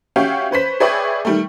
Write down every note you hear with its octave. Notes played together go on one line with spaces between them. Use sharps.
C#4 F#4 G4 E5 F5 G5
C#4 B4 C5 B6
G#4 B4 C#5 D5 E5 G5
D#3 G3 A3